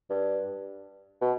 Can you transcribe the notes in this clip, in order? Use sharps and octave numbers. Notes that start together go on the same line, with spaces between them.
G2
B2